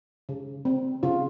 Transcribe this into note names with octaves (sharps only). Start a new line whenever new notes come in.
C#3
C4
C#3 F4